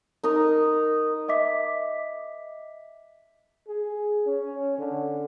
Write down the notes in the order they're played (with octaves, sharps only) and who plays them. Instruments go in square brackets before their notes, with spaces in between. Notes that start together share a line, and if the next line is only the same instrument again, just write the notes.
[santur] D#4 A#4 D#5
[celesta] D#5 E5 D6 B6
[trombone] G#4
C#4
D3